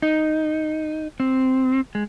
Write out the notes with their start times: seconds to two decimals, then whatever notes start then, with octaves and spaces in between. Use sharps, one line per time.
0.02 D#4
1.20 C4
1.95 G#3